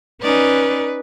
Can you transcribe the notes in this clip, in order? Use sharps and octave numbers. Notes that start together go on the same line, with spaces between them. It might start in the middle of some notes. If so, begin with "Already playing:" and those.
C#4 D#4 B4 D5